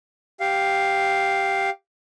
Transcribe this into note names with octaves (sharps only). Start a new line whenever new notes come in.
G4 F5